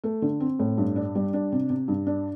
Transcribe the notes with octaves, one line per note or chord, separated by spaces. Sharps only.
A3
D3
C4
A2
G2
D4
G3
D4
C3
C3
G2
D4